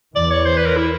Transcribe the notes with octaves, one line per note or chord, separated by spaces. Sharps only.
E2 E3 D5
C#5
C5
B4
A#4
E4